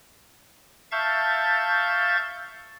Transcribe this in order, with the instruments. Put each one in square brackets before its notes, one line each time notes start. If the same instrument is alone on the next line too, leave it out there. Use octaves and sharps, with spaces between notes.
[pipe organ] E5 F5 A5 C#6 G6 A6